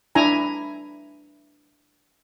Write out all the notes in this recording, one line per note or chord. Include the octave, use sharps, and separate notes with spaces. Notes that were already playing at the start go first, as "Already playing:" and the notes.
D4 E4 G#5 A#5